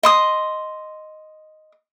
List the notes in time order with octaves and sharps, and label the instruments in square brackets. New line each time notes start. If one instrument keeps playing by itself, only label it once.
[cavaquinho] D#5 C6 D#6